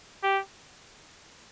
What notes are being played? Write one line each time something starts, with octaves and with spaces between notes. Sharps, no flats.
G4